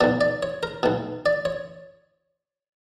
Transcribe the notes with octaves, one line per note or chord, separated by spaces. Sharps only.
B1 B2 D5
D5
C#5
A#4
B1 B2
D5
C#5